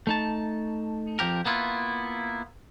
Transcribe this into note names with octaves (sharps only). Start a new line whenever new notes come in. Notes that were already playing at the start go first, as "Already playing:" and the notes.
A3 D#4 A5
F2 F3 G4 A#4
A#3 B3 E4 F4